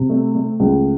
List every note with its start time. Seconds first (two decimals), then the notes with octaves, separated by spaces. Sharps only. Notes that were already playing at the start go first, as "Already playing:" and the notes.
Already playing: C3
0.10 A3
0.35 A3
0.60 C#2